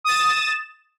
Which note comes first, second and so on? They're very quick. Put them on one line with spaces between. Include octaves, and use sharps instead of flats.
D#6 A6 E7